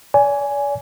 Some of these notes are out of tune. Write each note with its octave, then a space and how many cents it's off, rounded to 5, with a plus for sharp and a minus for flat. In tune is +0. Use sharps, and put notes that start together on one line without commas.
D5 -40 G#5 +0